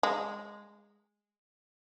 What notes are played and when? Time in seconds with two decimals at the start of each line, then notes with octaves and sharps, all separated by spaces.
0.03 G#3